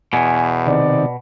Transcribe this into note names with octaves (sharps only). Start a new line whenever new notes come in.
E2 B2 G#5
C3 D#3 D5